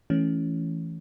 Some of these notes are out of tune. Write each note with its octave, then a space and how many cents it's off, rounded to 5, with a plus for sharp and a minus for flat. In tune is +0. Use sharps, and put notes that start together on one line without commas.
E3 +0 A3 -10 C#4 +0